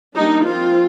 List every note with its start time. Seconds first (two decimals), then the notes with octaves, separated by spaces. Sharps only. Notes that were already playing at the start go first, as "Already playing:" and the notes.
0.16 G3 A#3 D4 D#4
0.46 F3 C4 F4